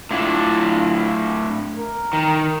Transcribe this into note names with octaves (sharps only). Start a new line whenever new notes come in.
A2 D4 E4 F4
A#4
D#3